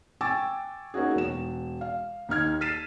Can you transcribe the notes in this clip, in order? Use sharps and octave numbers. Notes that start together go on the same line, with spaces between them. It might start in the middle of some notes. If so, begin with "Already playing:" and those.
G5 G#5 C#6 D6 E6 A6
A#3 C#4 D#4 F#4 G#4
E1 E7
F5
D#2 D#4 F6 G#6
F6 A6 B6 C7 D#7 E7